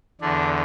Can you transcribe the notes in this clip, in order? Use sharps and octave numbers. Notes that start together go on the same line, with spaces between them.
E2 D3 D4